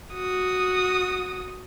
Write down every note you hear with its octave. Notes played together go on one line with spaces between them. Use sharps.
F#4 D#6